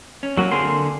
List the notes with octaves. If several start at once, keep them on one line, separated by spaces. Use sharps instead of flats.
C#4
F#3 A#3 C#4 F#4
D3 A#3 C4 G#4 C6